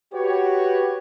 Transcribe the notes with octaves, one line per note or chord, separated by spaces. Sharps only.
F#4 G4 B4 C#5